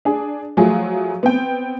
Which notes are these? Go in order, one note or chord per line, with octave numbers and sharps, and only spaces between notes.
D4 G#4
F3 F#3 A3 F4 G#4
B3 C4 G5